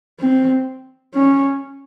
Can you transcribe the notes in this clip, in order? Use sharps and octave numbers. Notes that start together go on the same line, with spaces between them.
C4
C#4